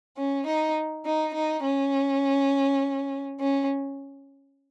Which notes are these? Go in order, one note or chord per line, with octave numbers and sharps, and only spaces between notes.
C#4
D#4
D#4
D#4
C#4
C#4